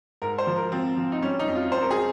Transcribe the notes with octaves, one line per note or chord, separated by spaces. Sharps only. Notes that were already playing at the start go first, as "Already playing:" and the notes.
G#2 A#4
C5
F3
A#4
F3 C4
F3
D#4
G3 C#4
D#4
F2
F4
F2 C5
A#4
G#4